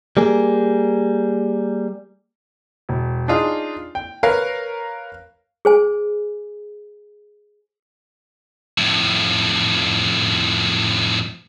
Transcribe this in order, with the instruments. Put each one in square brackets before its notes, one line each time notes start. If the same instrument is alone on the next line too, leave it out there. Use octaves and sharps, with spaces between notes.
[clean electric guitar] G3 A#3 G#4
[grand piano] E1
D4 D#4 F4 G#4
G5
A#4 B4 C#5 F5
[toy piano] G#4 C5 G#5
[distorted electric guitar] F2 A2